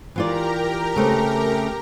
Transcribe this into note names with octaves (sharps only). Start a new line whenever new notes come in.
E3 F4 G4 A#4 D5 A#5
C#3 A3 C4